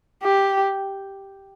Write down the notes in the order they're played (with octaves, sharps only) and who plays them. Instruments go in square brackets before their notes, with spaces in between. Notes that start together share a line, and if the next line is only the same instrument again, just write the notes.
[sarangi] G4